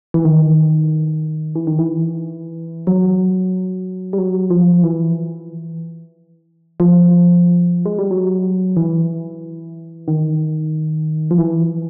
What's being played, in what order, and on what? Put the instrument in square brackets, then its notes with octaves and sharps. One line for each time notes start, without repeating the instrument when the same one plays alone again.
[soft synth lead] E3
D#3
E3
D#3
E3
F#3
G3
F#3
F3
E3
F3
G#3
G3
F#3
E3
D#3
F3
E3